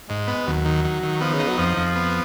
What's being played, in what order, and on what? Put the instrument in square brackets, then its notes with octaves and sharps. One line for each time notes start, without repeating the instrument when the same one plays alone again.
[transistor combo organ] G#2 [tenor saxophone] G#3
[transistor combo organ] B3
[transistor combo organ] D#2 [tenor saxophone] F#3
[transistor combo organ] D#3
D#3
D#3
[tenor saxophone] F3 [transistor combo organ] B3
[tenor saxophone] C#3
[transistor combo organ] D#4
[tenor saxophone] F#3
[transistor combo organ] F2 [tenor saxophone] F3
[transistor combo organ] F2
B3